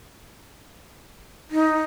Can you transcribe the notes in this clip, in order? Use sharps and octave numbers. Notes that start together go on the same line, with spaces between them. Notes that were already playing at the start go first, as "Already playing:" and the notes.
D#4